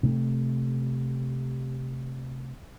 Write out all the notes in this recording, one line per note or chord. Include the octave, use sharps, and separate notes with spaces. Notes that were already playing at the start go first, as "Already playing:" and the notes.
C3 A3